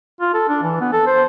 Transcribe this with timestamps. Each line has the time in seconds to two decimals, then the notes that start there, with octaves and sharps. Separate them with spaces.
0.21 F4
0.34 A4
0.49 D4
0.63 E3
0.81 B3
0.92 A4
1.07 C5